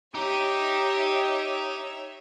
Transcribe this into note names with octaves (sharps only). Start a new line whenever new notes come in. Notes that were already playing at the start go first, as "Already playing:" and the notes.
D#4 G4 C#5 E5